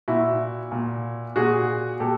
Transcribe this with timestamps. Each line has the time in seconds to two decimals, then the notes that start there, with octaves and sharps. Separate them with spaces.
0.08 A#2 E4 F#4
0.71 A#2
1.36 A#2 F#4 G#4
2.00 A#2 G4 A4